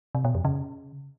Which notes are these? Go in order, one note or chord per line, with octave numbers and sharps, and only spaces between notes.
C3
B2
F2
C#3